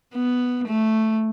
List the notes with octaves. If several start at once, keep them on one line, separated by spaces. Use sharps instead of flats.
B3
A3